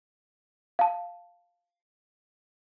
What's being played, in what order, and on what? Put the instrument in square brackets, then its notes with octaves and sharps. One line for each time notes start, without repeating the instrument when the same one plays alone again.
[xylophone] F5 A5